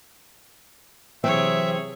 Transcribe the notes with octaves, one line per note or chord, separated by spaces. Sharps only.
C3 E3 F#3 C4 G#4 C#5 E5